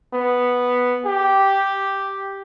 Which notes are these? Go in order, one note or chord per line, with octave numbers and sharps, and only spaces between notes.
B3
G4